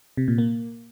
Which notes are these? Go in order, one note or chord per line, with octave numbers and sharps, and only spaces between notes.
C3
A#2
A#3